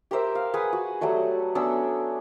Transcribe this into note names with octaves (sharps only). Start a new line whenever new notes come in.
G4 A#4 C5 E5
F5
G#4 B4 F#5 G#5
F#4
F#3 G3 A3 F#4
B3 C#4 D4 E6